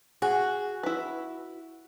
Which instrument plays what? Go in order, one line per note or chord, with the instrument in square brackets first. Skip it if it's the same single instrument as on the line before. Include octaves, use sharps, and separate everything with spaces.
[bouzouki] F#4 [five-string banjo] G#4
[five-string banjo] E4 B4